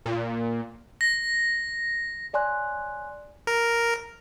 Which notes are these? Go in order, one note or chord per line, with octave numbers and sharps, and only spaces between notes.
A#2
A#6
C#5 D5 G#5 C6 F#6
A#4